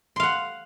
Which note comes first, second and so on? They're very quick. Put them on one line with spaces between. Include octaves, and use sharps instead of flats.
C6 F5 F#5